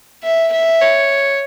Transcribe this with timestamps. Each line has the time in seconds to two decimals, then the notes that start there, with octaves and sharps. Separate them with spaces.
0.23 E5
0.52 E5
0.81 C#5